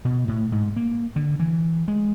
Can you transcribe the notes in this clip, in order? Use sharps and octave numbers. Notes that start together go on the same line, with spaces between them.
B2
A2
G#2
A#3
D3
E3
G#3